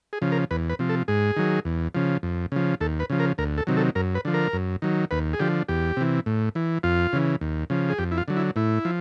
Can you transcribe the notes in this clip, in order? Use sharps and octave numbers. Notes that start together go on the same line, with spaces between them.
G#4
C#3 F3
A#4
E2 B4
B4
C3 F3
A4
G#2 G#4
D#3 F#3
E2
C#3 F3
F2
C#3 F3
D#2 A4
B4
C#3 F3
A#4
D2 A#4
A4
C3 D#3 F#3
A4
F#2 A#4
B4
D3 F3
A#4
F#2
D#3 F#3
D#2 B4
G#4
D3 F3 G4
E2 G4
C3 E3
A2
E3
F2 F4
C#3 E3
D#2
C#3 F3
G#4
F2 G4
E4
F4
D3 F#3
E4
A2 E4
F3